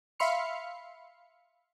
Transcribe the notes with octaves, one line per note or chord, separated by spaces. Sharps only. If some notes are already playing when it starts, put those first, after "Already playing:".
E5 F5 B5 C6 F6 C#7